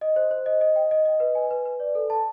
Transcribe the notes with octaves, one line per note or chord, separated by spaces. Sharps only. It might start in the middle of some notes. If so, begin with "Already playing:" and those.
D#5
C5
C5
D#5
D#5
G5
D#5
D#5
B4
G#5
B4
B4
D5
A4
A5